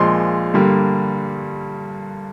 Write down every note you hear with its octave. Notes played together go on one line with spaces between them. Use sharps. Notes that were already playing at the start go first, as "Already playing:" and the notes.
Already playing: A#1 A#2 F3 G#3 C6
G2 D3 G3 A#3